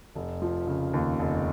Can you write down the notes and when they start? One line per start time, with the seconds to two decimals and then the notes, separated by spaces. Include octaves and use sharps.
0.15 F1
0.42 F3
0.67 C#3
0.94 D#2
1.19 F1